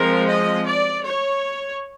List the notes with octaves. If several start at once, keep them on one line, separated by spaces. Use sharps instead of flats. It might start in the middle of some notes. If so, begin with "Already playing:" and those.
Already playing: F3 G#3 C4 A#4
D#5
D5
C#5